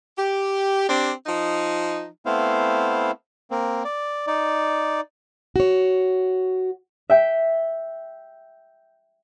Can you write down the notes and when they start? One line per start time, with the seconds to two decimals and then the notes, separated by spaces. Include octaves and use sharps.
0.17 G4
0.89 C4 D4 G4
1.26 F3 D#4
2.26 A3 B3 C4 E4 C5 F5
3.51 A#3 C4
3.84 D5
4.27 D#4 D5
5.56 F#4 C#5
7.10 E5 G5